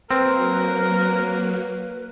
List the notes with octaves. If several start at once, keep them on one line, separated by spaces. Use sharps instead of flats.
F#3 A#3 C4 A#4 B4